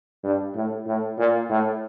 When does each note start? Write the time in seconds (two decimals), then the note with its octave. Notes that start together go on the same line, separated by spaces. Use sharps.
0.24 G2
0.56 A2
0.87 A2
1.19 A#2
1.50 A2